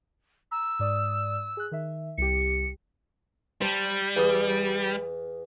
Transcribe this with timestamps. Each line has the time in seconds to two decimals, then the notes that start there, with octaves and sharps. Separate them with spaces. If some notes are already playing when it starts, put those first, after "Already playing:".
0.51 A#5 E6
0.79 G#2 D5 D#6
1.57 G#4 F#6
1.72 D#3 E5
2.18 C2 G4 C#7
3.61 G3 C5 A5
4.17 E2 D6 D#6